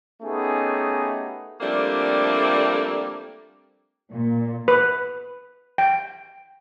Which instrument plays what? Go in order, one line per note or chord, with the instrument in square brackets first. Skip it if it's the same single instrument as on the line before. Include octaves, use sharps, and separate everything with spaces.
[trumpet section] A3 B3 C#4 D#4 G4 G#4
[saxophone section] F3 G3 A3 A#3 C4 D4
[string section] A#2
[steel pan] B4
G5